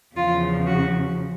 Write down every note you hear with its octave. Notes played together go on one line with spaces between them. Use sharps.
E2 C#3 F3 F4
F#4